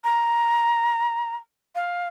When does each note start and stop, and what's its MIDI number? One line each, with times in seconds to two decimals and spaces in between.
0.04 1.35 82
1.75 2.08 77